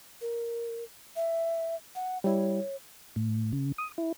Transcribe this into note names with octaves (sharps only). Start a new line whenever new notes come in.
A#4
E5
F#5
G3 E4 C#5
A2
C#3
D#6
E4